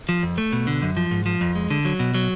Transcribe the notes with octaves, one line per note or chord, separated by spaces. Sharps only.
F3
F2
A3
B2
D3
F#2
F3
G#2
F3
F2
G#3
D3
F#3
B2
F#3